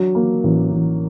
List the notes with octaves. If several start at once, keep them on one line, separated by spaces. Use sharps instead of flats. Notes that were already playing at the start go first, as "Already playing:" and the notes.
Already playing: F#3 D4
A#3
A1
A1